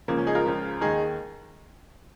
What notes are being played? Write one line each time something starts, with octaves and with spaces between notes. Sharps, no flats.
C#2 C#3 F3 A#3
C#4
D#4 G#4
F4 A#4
C#2 C#3 F3
D#2 D#3 D#4 G#4